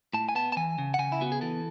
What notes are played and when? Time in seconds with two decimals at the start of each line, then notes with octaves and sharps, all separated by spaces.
0.13 A2 A5
0.29 G#5
0.35 B3 A5
0.52 A5
0.57 E3 G#5
0.78 C#3
0.94 F#5
0.99 C#3 G#5
1.12 E4
1.21 B3 F#4
1.32 G#4
1.41 E3 A4